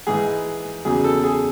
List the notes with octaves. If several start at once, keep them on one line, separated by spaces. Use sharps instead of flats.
G#2 E3 G#4
E2 C#3 F#3 G#4
A4
G#4